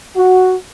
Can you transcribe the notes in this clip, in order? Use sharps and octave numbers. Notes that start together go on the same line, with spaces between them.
F#4